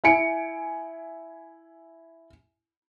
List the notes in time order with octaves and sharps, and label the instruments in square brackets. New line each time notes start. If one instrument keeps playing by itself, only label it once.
[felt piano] E4 G#5 C#7 D7